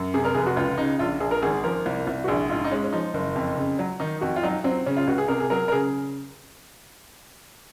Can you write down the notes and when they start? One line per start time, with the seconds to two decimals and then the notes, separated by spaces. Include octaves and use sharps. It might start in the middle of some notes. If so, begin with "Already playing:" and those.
Already playing: F#2
0.14 C3 G#4
0.24 A#4
0.34 F1 G#4
0.46 F#4
0.57 C#2 F4
0.78 C#3 D#4
0.99 A#1 F4
1.20 A#1 G#4
1.31 A#4
1.42 G#1 G#4
1.64 F3 A#4
1.86 C2
2.07 C2
2.24 F#4
2.28 A#1 G#4
2.50 G#2 F4
2.64 D#4
2.71 G#3 C#4
2.84 C#4
2.93 F3 D#4
3.14 F#1
3.36 F2
3.57 C#3
3.79 F#3
4.00 D#3 D#4
4.21 F2 F#4
4.36 F4
4.43 F#3 D#4
4.64 F#3 C4
4.86 C#3 C#4
4.97 F4
5.07 C#2 F#4
5.18 G#4
5.28 C3 A#4
5.40 G#4
5.50 F#3 A#4
5.68 A#4
5.72 C#3 G#4